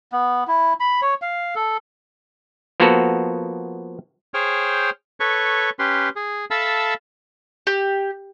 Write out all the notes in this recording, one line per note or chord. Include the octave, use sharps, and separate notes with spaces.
B3
E4
B5
C#5
F5
A4
F3 A#3 B3 F#4 A4
G#4 C5 C#5 G5 F6
A4 B4 C#5 C#6
C#4 G4 B4 C6
G#4
A4 E5 F5 A5 B5 E6
G4